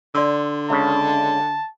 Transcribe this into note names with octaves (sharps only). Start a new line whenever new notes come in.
D3 D5 C6 E6
C#2 C#3 A5